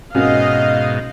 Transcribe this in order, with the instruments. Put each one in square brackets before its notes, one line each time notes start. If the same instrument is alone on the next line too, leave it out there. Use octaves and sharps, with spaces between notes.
[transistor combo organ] G#2 B2 [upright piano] C#4 F#4 A#4 [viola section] D#5 F5